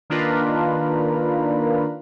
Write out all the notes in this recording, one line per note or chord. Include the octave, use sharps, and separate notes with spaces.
D#3 A#3 D4 F4 A#4 B4